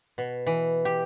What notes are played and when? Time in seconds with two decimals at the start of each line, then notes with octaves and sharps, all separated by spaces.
0.18 B2
0.46 E3
0.85 G4